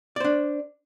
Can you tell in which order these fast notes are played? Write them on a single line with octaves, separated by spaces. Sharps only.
D5 C5 D4